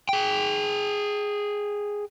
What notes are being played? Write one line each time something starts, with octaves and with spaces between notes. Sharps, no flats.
G#4 G5